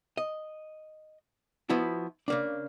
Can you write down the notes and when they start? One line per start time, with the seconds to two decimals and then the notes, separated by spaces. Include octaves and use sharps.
0.17 D#5
1.70 F3 B3 E4 F#4
2.28 C#3 A#3 D4